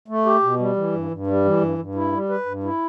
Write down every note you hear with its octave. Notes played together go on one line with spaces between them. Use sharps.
A3
G4
B2
G3
E3
G2
G2
G3
E3
G2
G2
E4
G3
B4
G2
E4